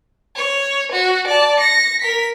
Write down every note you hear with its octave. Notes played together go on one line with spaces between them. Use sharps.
C#5
F#4
D5 A5
A#6 C#7
A#4 B6